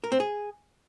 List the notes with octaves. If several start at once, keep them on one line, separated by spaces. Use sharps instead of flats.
A#4
C4
G#4